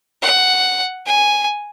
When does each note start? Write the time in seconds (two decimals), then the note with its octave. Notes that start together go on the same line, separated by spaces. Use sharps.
0.23 F#5
1.06 G#5